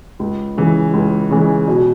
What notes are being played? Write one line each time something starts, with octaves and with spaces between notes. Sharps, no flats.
C#2
C#3 E3 G#3
C#2
C#3 E3 G#3
B2